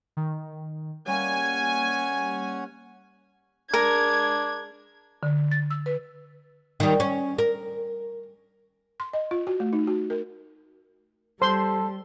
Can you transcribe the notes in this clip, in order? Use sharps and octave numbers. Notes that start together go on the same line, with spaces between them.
D#3
G3 A#3 C#4 C#5 F#5 G#5
G#3 D4 A#4 G#6
D3
A6
E6
B4
D#3 G3
C#4
A#4
C6
D#5
F4
F#4
A3
D#4
F#4
A#4
G3 A4 C5 C6